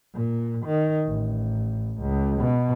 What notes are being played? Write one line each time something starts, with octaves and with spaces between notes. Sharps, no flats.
A#2
D#3
A1
C#2
B2